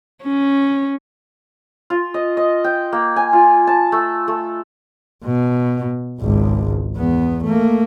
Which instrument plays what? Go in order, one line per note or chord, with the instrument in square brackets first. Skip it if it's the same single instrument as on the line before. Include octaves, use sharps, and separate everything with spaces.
[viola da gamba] C#4
[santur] F4
D#5
D#5
G5
A#3
G#5
F4
A5
A3
A3
[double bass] B2
G#1 C#2
E2 B3
A3 A#3